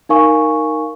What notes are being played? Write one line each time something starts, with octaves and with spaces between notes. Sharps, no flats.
D#4 A#4 F5 G#5 C#6